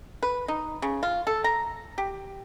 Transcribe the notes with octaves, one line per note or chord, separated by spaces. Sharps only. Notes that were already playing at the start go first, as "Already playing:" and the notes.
B4
D#4
C#3
F4
A4
A#5
G4